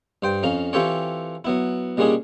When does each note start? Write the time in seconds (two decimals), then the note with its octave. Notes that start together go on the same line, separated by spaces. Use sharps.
0.23 G2 C5 G5
0.43 F2 C#4 F5 A#5
0.73 E3 C4 F4 G4 A4 C#5
1.45 F#3 B3 E4
1.97 A#2 G3 G#3 C#4 D4 G#4